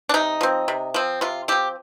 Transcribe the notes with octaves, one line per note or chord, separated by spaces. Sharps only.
D4
C3 D#4
F3 C4
C3
F3 C4
C3 F4
F3 C4 G4